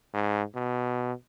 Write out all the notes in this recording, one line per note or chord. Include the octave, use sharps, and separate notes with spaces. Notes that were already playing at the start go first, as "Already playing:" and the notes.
G#2
B2